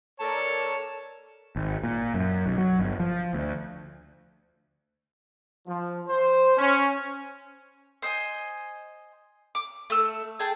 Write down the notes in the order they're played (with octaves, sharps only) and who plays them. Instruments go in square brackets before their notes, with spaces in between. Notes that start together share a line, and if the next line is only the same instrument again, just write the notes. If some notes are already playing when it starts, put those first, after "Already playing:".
[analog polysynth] A4 A#4 D5 [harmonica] C#5 A5
[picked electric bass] G#1
A#2
F#2
B1
F#3
G1
F3
D2
[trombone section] F3
C5
C#4
[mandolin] C5 D#5 G#5
D6
A3 E6
G#4 G5 A5